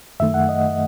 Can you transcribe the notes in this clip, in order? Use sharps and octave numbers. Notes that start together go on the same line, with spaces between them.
F#2 D#3 A3 E5
F#5
D#5